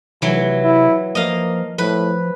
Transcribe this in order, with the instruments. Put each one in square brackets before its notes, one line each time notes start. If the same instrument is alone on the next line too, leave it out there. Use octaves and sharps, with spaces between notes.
[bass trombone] F1 [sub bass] C3 [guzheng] E3 F#3
[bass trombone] E4
[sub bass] F3 [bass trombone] A#3 [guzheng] D#5 F5
[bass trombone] A2 [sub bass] F3 [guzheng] B4